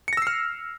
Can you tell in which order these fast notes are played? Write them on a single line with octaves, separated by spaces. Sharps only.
C#7 A#6 E6 C7 F6